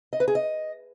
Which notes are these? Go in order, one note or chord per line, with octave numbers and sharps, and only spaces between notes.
D#5
B4
G#4
D#5